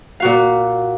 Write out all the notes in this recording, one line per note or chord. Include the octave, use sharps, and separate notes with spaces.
A#2 F#4 F5